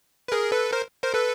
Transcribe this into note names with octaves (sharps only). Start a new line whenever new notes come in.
B4
G#4 A#4
A4 B4
A#4 C5
A#4 C5
A4 B4